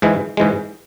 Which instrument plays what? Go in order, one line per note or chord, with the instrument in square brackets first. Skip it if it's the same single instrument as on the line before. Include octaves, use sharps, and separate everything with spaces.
[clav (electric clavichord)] G#2 E3 G#3
G#2 E3 G#3